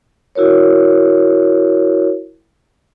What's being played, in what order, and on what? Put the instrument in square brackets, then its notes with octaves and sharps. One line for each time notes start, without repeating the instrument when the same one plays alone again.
[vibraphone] E4 F#4 A#4 C#5